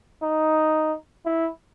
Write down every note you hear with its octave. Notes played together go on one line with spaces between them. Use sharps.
D#4
E4